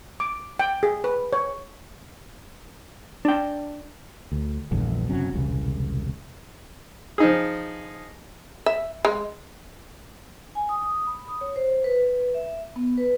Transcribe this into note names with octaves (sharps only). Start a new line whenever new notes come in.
D6
G5
G#4
B4
C#5
D4 G5
D2
A#1 E2 G2 D3
F#1 C3 F#3 C#4
E1 C2 C#3
F3 D#4 G#4
E5
G#3
G#5
D#6
D#6
B5
D#6
C#5
C5
B4
B4
E5
B3
B4